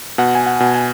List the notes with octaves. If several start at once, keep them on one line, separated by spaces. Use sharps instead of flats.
B2 F#5
G#5
F#5
B2
G#5